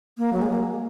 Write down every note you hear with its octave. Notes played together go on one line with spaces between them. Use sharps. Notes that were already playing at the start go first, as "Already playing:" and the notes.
A#3
F#3
G#3
A#3